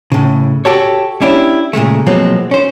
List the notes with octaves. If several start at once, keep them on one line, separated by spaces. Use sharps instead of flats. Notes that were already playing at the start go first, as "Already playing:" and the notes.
A2 C#3
F#4 G4 A4 C#5
C#4 D4 E4 G4
A#2 C#3 G#3 A3
B2 F3 F#3 G#3 A#3 C4
C#4 C5